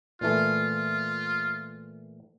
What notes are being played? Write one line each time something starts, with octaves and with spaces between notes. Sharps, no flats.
A#2 E3 A3 F4